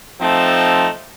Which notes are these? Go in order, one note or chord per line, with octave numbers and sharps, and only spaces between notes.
F3 A3 C4 D#4